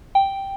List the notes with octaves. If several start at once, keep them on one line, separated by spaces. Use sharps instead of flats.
G5